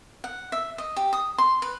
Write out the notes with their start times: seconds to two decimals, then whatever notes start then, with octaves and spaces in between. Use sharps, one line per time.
0.24 F#5
0.52 E5
0.78 D#5
0.96 G4
1.13 D#6
1.38 C6
1.62 B4